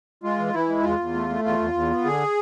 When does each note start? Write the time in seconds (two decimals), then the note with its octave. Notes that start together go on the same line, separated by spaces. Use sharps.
0.23 G#3 F4
0.38 E3
0.53 E3 E4
0.69 G#3
0.84 E2 F4
0.99 E2
1.14 A3
1.29 A3
1.44 E2 F4
1.59 E2
1.74 E2
1.90 B3
2.05 D3 G#4